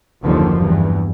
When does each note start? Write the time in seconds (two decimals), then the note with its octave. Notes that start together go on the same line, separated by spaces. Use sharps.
0.22 F#1 D#2 D3 F3
0.59 E2 G2